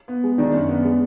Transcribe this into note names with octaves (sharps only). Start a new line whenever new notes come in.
B3
G#3
D#3 D4
F#2
B3
G#3